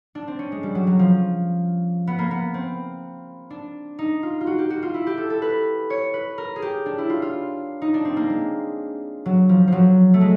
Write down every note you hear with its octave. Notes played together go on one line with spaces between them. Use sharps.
D4
C4
C#4
G#3
G3
F#3
F#3
F3
B3
A#3
B3
C4
D4
D#4
F4
F4
F#4
G4
F#4
F4
E4
G4
A4
A4
B4
C#5
B4
A#4
G#4
G4
D4
E4
F4
F4
D#4
D4
C4
A#3
G#3
F#3
F3
F3 F#3
A3
G#3